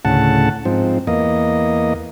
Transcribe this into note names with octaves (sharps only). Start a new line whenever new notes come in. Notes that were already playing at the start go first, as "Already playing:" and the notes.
D2 A2 C#3 F#5 A5
G#2 F3 C4
E2 A#3 D#5